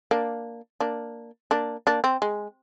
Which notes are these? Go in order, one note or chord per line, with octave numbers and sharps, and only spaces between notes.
A#3 D4
A#3 D4
A#3 D4
A#3 D4
C4
G#3